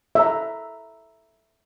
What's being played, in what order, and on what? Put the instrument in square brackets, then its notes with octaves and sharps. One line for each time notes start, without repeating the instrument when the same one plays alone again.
[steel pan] E5 A#5